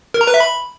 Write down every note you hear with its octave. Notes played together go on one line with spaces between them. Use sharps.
A#4
A#5
B4
E5
B5